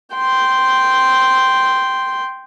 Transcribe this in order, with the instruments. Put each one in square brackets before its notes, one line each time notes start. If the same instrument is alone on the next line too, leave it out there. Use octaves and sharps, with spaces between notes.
[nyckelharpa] G5 C6